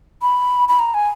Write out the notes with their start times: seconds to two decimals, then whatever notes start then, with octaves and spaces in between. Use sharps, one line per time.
0.22 B5
0.69 B5
0.79 A#5
0.94 G#5